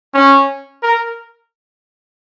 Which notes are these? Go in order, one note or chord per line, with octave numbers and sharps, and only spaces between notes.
C#4
A#4